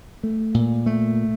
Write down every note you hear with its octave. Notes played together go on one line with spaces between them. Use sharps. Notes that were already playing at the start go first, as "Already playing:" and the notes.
A3
A#2
A3